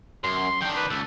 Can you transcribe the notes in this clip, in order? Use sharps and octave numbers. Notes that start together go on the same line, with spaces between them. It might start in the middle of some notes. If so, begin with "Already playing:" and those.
F#2 C6
D#3 D4 G5
B4
C#2 A4